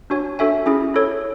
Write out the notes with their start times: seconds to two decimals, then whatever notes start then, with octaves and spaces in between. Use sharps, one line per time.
0.10 D4 F#4 C#5 G#5
0.39 D4 F#4 A4 E5 G#5
0.66 C#4 E4 G#4
0.94 E4 A4 C#5